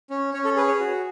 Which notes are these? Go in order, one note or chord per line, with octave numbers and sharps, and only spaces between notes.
C#4
C#4 C#5
A4
G#4 B4
C#5
F#4